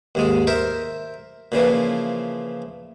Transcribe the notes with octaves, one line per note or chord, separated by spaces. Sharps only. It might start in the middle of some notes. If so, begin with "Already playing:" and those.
D#2 G#2 G#3
A#4 C5 E5
A#2 C#3 E3 F3